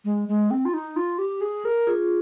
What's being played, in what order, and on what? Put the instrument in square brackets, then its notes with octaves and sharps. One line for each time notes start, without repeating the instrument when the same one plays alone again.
[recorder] G#3
G#3
C4
F4
D#4
F4
G4
G#4
A#4
[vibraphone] F4 G#4